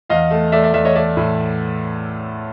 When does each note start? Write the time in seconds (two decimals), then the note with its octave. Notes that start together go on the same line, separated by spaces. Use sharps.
0.10 E2 D#5 F5
0.31 A3
0.52 A3 D5 E5
0.63 D5 E5
0.74 E2 D5 E5
0.85 C#5 D#5
0.95 A3 D5 E5
1.17 A2